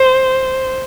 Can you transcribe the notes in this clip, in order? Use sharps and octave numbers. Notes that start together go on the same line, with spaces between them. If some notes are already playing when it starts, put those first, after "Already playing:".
Already playing: C5